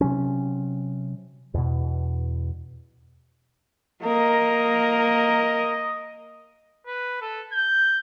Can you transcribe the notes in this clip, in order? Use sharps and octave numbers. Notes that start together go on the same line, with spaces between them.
C3 F#3 C#4
E2 B2
A#3 A#4 D#5
B4
A4
G6